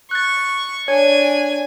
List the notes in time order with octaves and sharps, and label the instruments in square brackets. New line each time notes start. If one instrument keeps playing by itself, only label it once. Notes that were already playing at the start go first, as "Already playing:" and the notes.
[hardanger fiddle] C#6 [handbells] F#6 A6
[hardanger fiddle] D4 G#5 [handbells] C#5